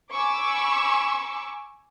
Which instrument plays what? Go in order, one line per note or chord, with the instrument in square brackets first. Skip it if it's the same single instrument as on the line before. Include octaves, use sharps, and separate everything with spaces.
[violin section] G#5 B5 C#6 D6 E6